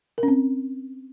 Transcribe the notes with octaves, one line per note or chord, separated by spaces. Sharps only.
A#4
C#4
C4